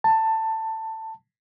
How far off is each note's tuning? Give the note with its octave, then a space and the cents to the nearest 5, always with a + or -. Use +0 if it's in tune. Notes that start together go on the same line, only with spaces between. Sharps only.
A5 +15